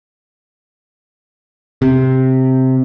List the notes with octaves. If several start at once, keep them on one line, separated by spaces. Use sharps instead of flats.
C3